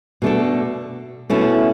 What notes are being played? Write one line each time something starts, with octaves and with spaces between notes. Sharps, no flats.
B2 A3 D4 A4
B2 A3 C#4 E4